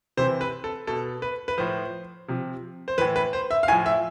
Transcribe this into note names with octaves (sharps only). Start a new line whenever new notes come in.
C3 E3 C5
B4
A4
B2 A4
B4
B4
A2 F3 C5
C3 F3
C5
A2 E3 B4
B4
C5
E5
F5
A2 F3 G#5
E5